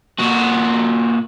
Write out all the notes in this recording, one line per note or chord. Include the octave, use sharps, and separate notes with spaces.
A#2 F#4